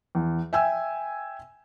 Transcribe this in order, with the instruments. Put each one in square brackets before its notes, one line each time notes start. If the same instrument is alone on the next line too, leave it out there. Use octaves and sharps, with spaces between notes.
[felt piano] E2
E5 G5 G#5 E6